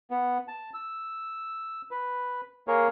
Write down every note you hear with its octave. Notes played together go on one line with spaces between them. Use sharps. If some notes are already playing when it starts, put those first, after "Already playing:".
B3
A5
E6
B4
A#3 G#4 A#4 C#5